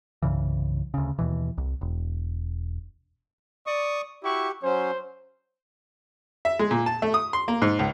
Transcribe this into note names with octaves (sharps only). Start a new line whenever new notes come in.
C2 G2 C#3 E3
D2 C#3
D#2 B2 E3
C2
E1
D5 C#6 D#6
E4 F#4 G4 C#6
F#3 C#4 C5
E5
G#3
A#2
A5
A3
D#6
C6
A#3
G#2
C#2